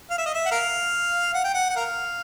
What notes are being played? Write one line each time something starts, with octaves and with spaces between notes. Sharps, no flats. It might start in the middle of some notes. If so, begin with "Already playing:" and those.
F5
E5
D#5
E5
F#5
A#4 F5
F#5
G5
F#5
F#5
A#4 F5